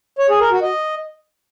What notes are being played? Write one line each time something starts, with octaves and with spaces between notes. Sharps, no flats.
C#5
G#4
A#4
F#4
D#5